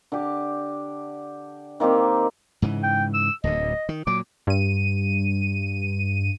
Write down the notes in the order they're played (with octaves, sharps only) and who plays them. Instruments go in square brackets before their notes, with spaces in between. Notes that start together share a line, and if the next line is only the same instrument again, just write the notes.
[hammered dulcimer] D3 G4
D#3 A#3 C4 G4
[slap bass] G#2 C#3 E3
[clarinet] G5
E6
[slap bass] D1 D2 D3 [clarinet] D#5
[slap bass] D#3
[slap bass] A#2 F#3 [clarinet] D6
[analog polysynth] G2 D#7